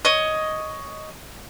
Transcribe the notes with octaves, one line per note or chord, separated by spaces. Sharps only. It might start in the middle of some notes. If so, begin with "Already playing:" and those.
C#5 D#5